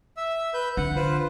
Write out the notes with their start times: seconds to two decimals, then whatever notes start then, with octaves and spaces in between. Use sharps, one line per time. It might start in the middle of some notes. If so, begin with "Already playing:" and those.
0.17 E5 E6
0.54 B4 G6
0.77 D3 F#5
0.96 F4 B4 C5